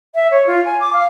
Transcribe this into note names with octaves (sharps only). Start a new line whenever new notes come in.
E5
C#5
F4
G#5
D6
F5